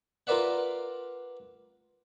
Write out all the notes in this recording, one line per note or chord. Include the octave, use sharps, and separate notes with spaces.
F4 A#4 B4 D5 E5 F#5